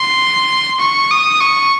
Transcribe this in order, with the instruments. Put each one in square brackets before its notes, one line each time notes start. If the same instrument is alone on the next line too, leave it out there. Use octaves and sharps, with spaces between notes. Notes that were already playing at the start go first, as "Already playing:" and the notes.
Already playing: [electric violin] C6
C#6
D#6
C#6